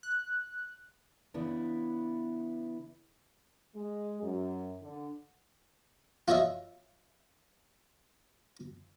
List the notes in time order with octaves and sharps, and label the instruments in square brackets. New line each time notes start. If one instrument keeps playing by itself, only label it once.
[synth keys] F#6
[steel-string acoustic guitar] C#3 E3 B3 D4 E4
[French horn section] G#3
F#2
D3
[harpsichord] F4 F#4 C#5 D#5 E5